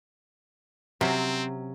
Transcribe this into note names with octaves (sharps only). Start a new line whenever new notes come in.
C3 F#3 C4 C#4